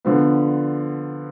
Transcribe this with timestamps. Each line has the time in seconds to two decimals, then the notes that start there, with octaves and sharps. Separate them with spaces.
0.05 D3 F3 B3